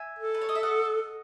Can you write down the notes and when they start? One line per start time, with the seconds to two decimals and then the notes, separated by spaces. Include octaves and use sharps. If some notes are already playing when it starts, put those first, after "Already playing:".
Already playing: E5 G#5
0.19 A4
0.34 B4
0.41 C#5
0.49 D#5
0.55 E5
0.63 D#5 F#5